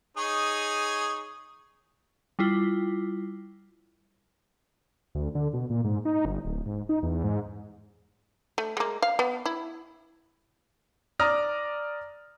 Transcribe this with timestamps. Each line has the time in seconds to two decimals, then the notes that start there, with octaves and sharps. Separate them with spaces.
0.17 D#4 G#4 C#5
2.39 G3 E4 F4
5.15 D2
5.35 D3
5.54 B2
5.70 A#2
5.84 G#2
6.05 D#4
6.25 G1
6.45 D1
6.66 G#2
6.89 D#4
7.03 E2
7.24 G#2
8.58 A3
8.77 G#3 A#3
9.02 F5
9.19 B3
9.46 E4
11.20 D5 A#5 D#6 F6 A#6